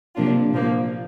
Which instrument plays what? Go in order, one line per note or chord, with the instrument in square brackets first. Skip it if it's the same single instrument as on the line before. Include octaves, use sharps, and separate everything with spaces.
[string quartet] C3 F3 A#3 D4 F4
A#2 F3 A#3